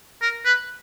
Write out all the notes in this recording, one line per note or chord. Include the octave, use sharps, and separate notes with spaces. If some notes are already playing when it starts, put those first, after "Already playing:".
A#4
B4